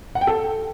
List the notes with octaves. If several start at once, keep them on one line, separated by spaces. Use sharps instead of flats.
F#5
G5
A4